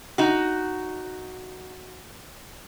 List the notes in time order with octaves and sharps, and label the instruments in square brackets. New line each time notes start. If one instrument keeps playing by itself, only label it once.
[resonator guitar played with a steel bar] D#4 F#4